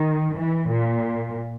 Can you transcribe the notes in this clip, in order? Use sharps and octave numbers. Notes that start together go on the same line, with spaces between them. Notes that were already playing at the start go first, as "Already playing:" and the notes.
Already playing: D#3
E3
A#2